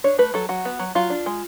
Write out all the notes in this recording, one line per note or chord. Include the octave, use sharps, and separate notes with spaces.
D4 C#5
A3 B4
F#3 A4
F#3 F#4
B3
F#3
F#3 F4
D4
G#3